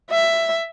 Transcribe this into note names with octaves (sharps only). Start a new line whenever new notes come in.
E5